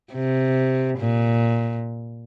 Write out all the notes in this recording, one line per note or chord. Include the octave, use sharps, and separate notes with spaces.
C3
A#2